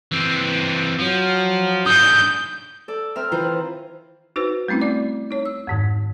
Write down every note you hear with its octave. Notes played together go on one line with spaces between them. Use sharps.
E3 C4
F3 F#3
G#2 D3 D#6 G6
A4 D5
C4 A#4 E5 F6
D#3 E3 E4 F4 A#4 C5
D#4 F#4 B4 C5
G3 A3 C4 C#4 E4
D5 D6
D#4 C#5
E6
F2 G#2 D#3